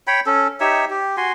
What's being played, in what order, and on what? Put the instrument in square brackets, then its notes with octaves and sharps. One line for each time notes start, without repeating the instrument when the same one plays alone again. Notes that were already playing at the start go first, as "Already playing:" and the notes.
[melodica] C#5 G5 B5
C#4 A4
D#4 G4 C#5 E5
G4
F#4 G#5 C6